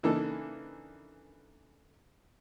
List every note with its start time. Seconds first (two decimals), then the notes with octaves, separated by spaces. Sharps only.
0.03 C#3 E3 A#3 D4 D#4 A4